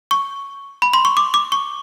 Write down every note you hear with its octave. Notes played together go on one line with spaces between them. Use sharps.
C#6
B5
C6
C#6
D6
D6
C#6